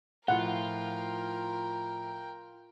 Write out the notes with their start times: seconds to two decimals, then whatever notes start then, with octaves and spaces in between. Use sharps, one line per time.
0.28 A2 F3 F4 A#4 F#5 G5